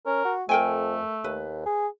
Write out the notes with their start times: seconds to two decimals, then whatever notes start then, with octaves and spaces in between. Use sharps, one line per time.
0.06 C#4 A#4
0.25 F#4
0.49 F2 A3 A#4 G5 G#5
1.24 D#2 B4
1.66 G#4